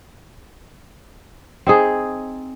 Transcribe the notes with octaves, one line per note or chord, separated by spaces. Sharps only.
C4 D#4 G#4